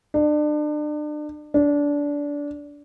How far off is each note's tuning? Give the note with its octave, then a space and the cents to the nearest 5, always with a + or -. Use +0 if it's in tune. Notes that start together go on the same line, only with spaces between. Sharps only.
D4 +35
D4 -20